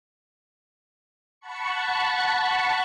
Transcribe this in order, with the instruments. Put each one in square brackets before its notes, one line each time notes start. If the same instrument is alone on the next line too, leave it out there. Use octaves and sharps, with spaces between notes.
[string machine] F#5 A5 B5 C#6 C#7